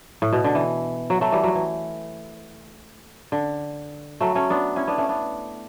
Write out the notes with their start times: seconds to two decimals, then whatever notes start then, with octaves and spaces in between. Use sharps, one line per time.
0.22 A2
0.33 B2
0.44 D3
0.55 E3
1.10 F#3
1.21 F#3 A3
1.32 E3 G3
1.44 F#3
1.55 E3
3.32 D3
4.20 F#3 A3
4.35 A3 C#4
4.50 B3 D4
4.76 C#4 E4
4.87 B3 D4
4.98 A3 C#4
5.09 B3 D4